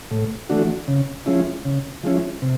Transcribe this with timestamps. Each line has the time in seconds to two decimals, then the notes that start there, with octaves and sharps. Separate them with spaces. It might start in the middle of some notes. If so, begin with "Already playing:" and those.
0.11 A2
0.49 E3 A3 D4 F#4
0.88 C#3
1.26 F3 G#3 C#4 E4
1.65 C#3
2.04 F3 G#3 C#4 E4
2.42 C3